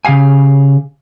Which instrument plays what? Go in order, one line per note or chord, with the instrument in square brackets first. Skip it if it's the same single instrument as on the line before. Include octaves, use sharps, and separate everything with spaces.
[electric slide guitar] C#3 C4 G4 F5 G#5